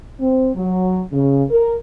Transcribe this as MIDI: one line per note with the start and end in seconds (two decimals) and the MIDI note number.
0.19 0.49 60
0.54 1.00 54
1.11 1.43 49
1.49 1.73 70